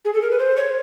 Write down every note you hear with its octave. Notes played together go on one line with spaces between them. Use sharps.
G#4
A4
A#4
B4
C5
C#5